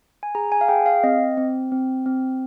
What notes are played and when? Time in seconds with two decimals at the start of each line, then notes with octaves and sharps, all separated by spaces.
0.23 G#5
0.35 G#4 A#5
0.52 G#5
0.61 F5
0.68 G#4 G5
0.86 F5
1.04 C4 D#5
1.37 C4
1.72 C4
2.06 C4